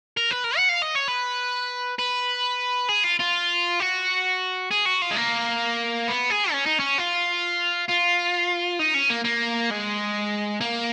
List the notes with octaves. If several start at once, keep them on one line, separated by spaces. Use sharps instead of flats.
A#4
B4
A#4
F#5
F5
D#5
C#5
B4
B4
G#4
F4
F4
F#4
G#4
F#4
F4
G#3
A#3
B3
G#4
C#4
D#4
C#4
F4
F4
D#4
C#4
A#3
A#3
G#3
A#3